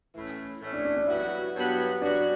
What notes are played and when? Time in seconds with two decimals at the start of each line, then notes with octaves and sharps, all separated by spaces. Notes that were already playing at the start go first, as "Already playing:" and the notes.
0.14 A2 E3 A3 C#4 E4
0.61 A2 E3 A3 C#4 E4
0.73 D4
0.85 D4
0.96 D4
1.07 G2 F#3 B3 E4 F#4
1.55 G2 F#3 B3 F#4
2.01 G2 F#3 B3 D4 F#4